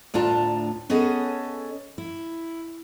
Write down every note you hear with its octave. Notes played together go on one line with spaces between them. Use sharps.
D2 A2 D4 F4 A5 A#5
B3 C#4 G#4 A4 D#5
E4